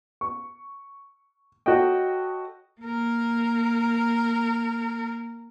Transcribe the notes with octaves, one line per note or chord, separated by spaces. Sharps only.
C#6
F#4 A4 C#5 D#5 G5
A#3 A#4